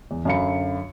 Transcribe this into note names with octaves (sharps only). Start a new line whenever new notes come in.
E2
F#2 D3 F5 B5 C#7